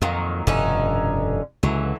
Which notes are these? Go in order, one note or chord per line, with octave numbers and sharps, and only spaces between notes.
F2 A#2 D#3 F#3
F1 G2 B2 D3 C#4 D#4
C#2 D3 E3 F#3